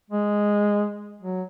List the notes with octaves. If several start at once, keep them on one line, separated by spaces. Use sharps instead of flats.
G#3
F#3